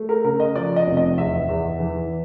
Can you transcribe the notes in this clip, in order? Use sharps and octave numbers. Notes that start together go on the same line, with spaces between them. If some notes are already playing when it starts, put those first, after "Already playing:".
Already playing: A3
A#4
C#3 A#4
D#5
F3 D5
D#5
F1
D#5
E2 E5
E2
E3